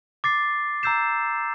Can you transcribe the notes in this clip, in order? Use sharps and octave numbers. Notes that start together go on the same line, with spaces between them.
D6 A6 C7
A#5 E6 G6 C7 E7